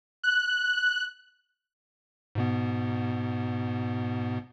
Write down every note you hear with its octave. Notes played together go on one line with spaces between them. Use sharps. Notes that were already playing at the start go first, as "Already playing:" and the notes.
F#6
G#2 B2 B3